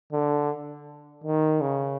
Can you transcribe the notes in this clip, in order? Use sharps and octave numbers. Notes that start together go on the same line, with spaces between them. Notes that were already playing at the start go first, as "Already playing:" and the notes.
D3
D#3
C#3